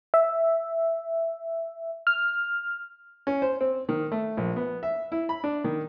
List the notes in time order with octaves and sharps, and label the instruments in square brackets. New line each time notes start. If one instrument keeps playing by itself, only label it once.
[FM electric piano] E5
F6
[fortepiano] C#4
C5
C4
D#3
A3
A#1
B3
E5
E4
B5
D4
D#3